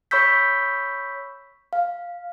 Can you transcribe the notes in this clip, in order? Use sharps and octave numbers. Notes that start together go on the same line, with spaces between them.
C#5 B5 C#6 E6 G6 B6
F5